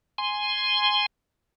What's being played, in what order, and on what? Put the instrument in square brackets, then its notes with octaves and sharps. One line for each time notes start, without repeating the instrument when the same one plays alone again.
[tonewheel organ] G#5 C6